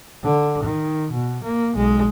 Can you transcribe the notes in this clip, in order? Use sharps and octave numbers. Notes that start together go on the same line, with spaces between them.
D3
D#3
B2
A#3
B1 G#3